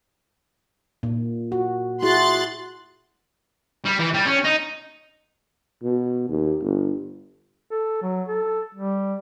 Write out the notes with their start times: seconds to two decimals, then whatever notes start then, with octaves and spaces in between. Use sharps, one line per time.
1.03 A#2
1.52 F#4
2.03 E4 F#4 G#4 C6 F#6 A6
3.86 G3
3.99 E3
4.15 G3
4.27 C#4
4.44 D#4
5.84 B2
6.29 D#2
6.62 G1
7.71 A4
8.02 F#3
8.28 A4
8.75 G3